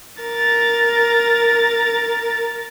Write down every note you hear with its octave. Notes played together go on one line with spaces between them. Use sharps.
A#4 A6